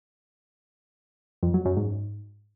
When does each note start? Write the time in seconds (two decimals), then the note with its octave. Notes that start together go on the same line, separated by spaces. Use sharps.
1.43 F2
1.54 F#3
1.65 F#2
1.77 G#2